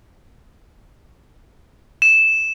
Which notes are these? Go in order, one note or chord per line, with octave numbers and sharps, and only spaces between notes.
E7